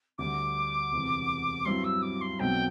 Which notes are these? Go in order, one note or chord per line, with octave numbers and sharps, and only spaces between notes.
D2 D3 G3 D4 D6
E1 E2 C3
G2 F#3 C4 E4 C6
E6
D6
C6
B1 B2 F#3 C4 G5